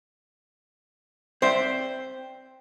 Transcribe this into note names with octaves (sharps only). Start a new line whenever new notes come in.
C4 C5 D5 E5